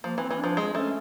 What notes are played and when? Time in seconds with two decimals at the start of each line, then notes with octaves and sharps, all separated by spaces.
0.04 F3 A#3
0.18 E3
0.22 C4
0.31 E3
0.39 F3 D4
0.57 G#3
0.75 A3 C#4